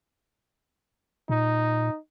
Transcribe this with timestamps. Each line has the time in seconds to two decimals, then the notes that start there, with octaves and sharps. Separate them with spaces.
1.29 A#2 D#4